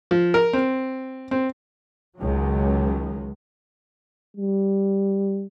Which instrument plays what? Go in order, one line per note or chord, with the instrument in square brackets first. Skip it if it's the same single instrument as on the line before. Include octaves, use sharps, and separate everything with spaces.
[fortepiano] F3
A#4
C4
C4
[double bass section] C#2 D#3 F#3
[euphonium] G3